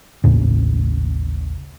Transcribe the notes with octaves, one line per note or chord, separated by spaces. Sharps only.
A1 D#2 A2 C#3